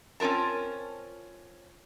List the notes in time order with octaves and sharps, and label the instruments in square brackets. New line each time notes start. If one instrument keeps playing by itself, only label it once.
[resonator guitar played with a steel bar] C4 C#4 F4 A#4 A5